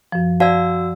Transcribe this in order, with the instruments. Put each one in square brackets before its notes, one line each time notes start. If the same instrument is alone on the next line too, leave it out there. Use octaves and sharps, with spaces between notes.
[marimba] F#2 F3
[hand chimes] F#4 E6 [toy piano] D5 F5 A5